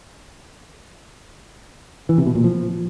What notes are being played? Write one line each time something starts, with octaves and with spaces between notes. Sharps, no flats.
E3
C3
B2
A#2
F3